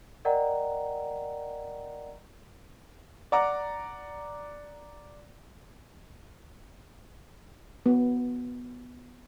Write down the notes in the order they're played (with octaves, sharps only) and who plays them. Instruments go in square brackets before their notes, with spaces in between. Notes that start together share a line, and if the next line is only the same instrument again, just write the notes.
[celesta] A#4 D5 D#5 F#5 G5 A#5
[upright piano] D5 F#5 A#5 D6
[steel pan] B3